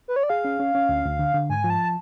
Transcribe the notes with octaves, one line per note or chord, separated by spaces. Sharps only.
B4
C#5
D5
G#4 F5
C#4
C#4
C#4
D2
D2
D3
D3
G#2 G#5
F3
A5